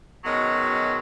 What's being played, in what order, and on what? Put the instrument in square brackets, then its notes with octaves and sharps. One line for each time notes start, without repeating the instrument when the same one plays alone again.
[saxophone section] B2 D#3 F#3 G#3 C#4